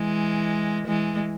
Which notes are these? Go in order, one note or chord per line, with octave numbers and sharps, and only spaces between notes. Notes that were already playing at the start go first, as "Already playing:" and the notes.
Already playing: E3 G#3
E3 G#3